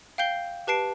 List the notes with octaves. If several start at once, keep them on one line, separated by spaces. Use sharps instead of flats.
F5 G5 G6 C7 G7
G4 B4 A5 C7 D7